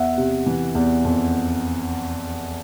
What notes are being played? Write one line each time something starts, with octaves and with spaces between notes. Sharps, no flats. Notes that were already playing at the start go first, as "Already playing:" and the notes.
Already playing: E2 E5 F#5
C3
E3
E2
F2